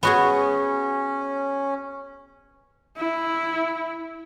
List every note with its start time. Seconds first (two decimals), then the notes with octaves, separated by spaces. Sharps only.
0.03 B3 C#4 F#4 G#4
2.97 E4